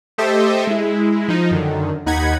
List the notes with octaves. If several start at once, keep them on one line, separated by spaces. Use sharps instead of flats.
A3 G4 A4 C5 D#5 E5
G#3 E4
F3 D#4
F#2 D3 D#3
D#2 D#4 F#5 B5 G#6